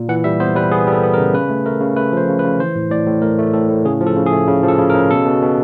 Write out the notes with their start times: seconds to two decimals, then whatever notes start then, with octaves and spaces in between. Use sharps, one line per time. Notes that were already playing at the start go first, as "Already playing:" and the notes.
Already playing: A#2
0.09 E3 F#5
0.24 G3 E5
0.40 B3 C5
0.55 G3 B4
0.71 B3 G#4
0.87 G3 A4
1.03 B3
1.14 A#4
1.18 C#3
1.34 C#3 B4
1.50 A3
1.66 A3 A#4
1.81 C#3
1.96 A3 B4
2.12 F3 C5
2.29 C#3
2.39 B4
2.44 C#3
2.59 E3 C5
2.76 A2
2.90 A2 D5
3.07 A2
3.22 A3 A#4
3.39 A3
3.53 A2 A4
3.69 A2
3.85 C#3 G#4
4.00 F3
4.06 A4
4.16 C#3
4.26 G#4
4.32 A3
4.48 C#3
4.63 F3
4.68 A4
4.78 C#3
4.90 A#4
4.95 C#3
5.11 B2 A4
5.26 B2
5.42 B2